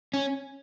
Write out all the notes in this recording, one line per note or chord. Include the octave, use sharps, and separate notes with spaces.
C#4